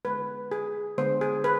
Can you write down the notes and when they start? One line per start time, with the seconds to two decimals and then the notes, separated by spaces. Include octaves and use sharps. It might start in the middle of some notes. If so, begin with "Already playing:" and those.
0.05 D3 G#3 B3 B4
0.51 G#4
0.98 D3 G#3 B3 C5
1.21 G#4
1.44 B4